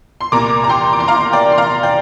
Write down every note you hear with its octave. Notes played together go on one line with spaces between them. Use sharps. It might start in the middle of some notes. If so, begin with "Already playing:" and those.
C6
C2 A#2 A#3 A#5 D6
A#5
G5 C6
D6
C6
F5 A#5
D5 G5
C6
F5 A#5
D5 G5